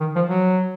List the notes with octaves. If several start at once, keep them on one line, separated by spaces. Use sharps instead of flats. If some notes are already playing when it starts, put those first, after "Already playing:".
D#3
F3
F#3